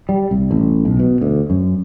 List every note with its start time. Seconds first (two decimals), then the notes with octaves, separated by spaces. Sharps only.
0.09 G3
0.31 C2
0.51 A1
0.85 B1
1.00 B2
1.21 D2
1.50 F#2